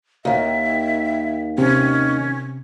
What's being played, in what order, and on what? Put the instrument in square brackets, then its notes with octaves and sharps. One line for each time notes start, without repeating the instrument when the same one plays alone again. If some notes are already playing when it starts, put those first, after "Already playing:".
[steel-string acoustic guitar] D#2 D#3 [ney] E5
[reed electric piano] C3 [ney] C#4